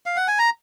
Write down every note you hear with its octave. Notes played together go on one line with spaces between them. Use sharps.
F5
F#5
G#5
A#5